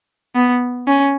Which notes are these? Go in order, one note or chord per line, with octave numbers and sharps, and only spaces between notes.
B3
C#4